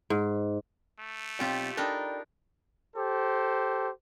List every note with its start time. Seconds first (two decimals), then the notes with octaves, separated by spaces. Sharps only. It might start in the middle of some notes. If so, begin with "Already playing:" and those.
0.10 G#2
0.99 A3
1.40 B1 C4 F4 G4 G5
1.77 D4 D#4 A4 A#4 D5 G5 B5
2.96 G4 A4 C5